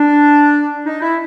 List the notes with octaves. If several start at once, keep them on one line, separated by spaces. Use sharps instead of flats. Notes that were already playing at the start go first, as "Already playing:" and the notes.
Already playing: D4
D#4
E4